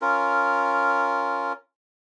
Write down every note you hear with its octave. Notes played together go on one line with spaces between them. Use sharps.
C#4 F4 A#4